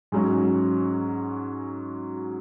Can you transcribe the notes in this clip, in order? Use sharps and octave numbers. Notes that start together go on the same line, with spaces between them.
G#2 F#3 C#4